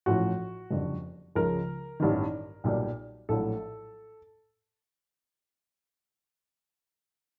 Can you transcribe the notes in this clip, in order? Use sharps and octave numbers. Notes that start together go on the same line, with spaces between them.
A1 A2 F3 F#4
F#1 F2 D3 G3
C#2 C#3 F3 A#4
A1 G2 D#3
B1 A#2 G3
A#1 A2 F#3 A4